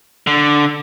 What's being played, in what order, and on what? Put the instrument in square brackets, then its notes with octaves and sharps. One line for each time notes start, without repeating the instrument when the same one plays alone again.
[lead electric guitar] D3